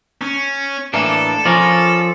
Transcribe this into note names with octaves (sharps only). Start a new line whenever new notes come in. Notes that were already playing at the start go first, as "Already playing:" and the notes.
C#4
A2 E3 A#3 D4 A4
F3 C#4 F4 A#4 D5